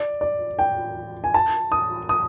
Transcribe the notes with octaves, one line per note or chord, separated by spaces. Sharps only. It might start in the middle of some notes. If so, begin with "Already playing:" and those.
Already playing: D5
D5
G5
G#5
A5
D#6
D#6